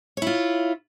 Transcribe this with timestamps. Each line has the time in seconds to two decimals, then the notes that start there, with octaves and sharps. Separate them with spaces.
0.17 C#5
0.22 E4
0.27 F4